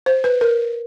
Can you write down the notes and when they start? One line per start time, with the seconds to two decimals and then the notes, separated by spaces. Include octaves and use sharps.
0.06 C5
0.24 B4
0.41 A#4